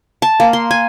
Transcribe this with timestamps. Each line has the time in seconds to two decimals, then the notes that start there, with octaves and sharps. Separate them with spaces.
0.22 A5
0.40 A#3
0.53 C6
0.71 G#5